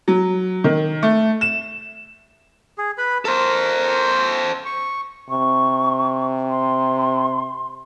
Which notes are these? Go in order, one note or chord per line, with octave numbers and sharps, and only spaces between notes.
F#3
D#3
A3
E7
G#4
B4 B5
A4 A#4 C5
C#6
C3 C#6
C6